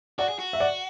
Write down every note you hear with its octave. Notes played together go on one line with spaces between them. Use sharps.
F#4 D5 F#5
G#4
F#4
E5
D5 F#5